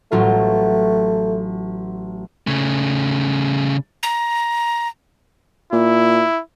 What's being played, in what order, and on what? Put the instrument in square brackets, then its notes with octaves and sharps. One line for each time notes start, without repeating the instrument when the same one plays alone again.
[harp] A1 F#3 F4 [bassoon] A3
[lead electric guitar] C#3 A3
[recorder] A#5
[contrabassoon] A#2 [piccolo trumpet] E4